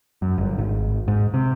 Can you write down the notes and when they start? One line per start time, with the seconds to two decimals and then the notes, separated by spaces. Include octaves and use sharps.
0.22 F#2
0.38 G1
0.58 G#1
1.08 G#2
1.34 C3